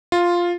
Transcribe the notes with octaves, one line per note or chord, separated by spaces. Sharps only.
F4